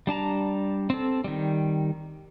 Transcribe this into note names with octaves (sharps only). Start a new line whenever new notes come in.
G3 D4 A5 A#5
C4 A4
D#3 G3